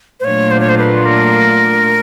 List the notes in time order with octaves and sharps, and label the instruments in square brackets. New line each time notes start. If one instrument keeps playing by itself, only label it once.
[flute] C5
[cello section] A#2 F#3 A3 D4 F4 [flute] C#5
[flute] C5
C#5
C5
B4
A#4